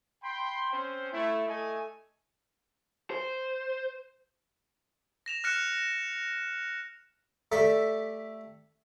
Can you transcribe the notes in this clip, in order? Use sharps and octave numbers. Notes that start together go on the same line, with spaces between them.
G5 B5 C6
C4 C#4 C5
A3 E4
A3 E4 A4 D#5 G#5
C5
A#6 E7 F7
F6 F#6 A#6 C#7 E7
A3 G4 A4 D5 E5